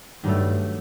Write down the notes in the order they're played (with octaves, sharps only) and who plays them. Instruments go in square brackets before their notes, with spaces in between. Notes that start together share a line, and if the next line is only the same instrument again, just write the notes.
[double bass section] G2 [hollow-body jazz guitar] D#3 F#3 A3